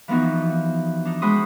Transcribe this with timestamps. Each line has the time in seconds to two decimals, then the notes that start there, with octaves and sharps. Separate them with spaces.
0.08 E3 F3 B3 D#4 F#4
1.05 D4 D#4
1.22 G#3 F#4 C5 B5 C6 D#6